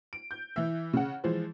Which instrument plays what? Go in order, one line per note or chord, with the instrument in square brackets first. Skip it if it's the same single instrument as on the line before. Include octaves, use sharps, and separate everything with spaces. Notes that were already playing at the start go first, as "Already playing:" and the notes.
[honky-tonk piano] D7
G6
E3 E5
C#3 F#5
E3 F3 G#3 C5